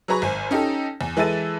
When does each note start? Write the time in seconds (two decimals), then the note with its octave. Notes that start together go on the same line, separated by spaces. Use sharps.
0.08 F#3 G#4 B4 A#5 C#6
0.22 G#1 C5 G#5
0.51 C#4 D#4 G4 A4
1.01 E2
1.17 E3 G#3 E4 A4 A6 D#7